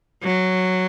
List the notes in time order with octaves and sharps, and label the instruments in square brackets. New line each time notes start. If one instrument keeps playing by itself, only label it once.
[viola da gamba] F#3